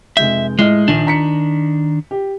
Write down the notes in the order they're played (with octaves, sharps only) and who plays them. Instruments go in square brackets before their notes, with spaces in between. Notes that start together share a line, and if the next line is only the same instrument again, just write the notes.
[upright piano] F1 G#3 G6 [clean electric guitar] E5
[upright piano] A2 D#5 F6 [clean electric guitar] G#3
[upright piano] A#1 [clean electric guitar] D#3 D4
[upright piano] A#5 B6 C#7
G4